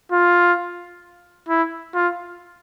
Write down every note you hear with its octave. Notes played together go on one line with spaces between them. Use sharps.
F4
E4
F4